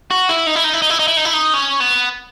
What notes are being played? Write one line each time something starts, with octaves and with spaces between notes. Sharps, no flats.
F#4
E4
D#4
E4
D#4
E4
D#4
E4
D#4
E4
D#4
E4
D#4
C#4
B3